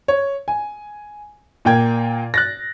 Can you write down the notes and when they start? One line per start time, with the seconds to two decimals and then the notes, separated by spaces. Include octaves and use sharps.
0.08 C#5
0.48 G#5
1.65 A#2 A#3 G5 G#6
2.34 F#6 A6 A#6